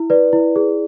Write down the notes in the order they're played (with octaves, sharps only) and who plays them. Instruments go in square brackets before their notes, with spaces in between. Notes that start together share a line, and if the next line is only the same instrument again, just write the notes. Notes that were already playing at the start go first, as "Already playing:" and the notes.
Already playing: [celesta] E4
B4 D5
E4
G#4